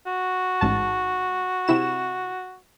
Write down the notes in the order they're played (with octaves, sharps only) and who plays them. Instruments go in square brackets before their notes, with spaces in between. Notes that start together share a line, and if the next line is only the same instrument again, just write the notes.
[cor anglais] F#4
[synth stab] A1 G#2 A5
C3 E4 E7